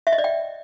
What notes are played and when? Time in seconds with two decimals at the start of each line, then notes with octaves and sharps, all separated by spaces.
0.07 E5
0.13 D#5
0.18 D5
0.24 G5